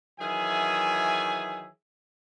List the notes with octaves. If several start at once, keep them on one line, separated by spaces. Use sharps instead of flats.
D#3 E3 F#3 G#4 E5 G#5